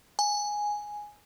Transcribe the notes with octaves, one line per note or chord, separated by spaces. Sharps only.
G#5